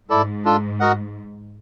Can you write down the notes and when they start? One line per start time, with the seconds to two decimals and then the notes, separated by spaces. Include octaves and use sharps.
0.09 G#2 E4 A4 D5
0.45 D4 F4 A4
0.80 F#4 A#4 D#5 F#5